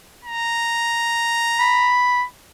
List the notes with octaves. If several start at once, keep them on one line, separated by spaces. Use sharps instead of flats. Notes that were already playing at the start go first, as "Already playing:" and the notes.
A#5
B5